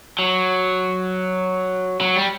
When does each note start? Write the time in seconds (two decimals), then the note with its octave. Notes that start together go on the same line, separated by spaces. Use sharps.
0.19 F#3
2.01 F#3
2.16 G3